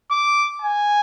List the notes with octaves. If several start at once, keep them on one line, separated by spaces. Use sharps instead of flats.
D6
G#5